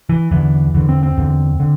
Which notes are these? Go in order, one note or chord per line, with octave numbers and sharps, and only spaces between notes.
E3
E2 D3 E3
E2 D3 E3
C4
C4
E2 D3
D3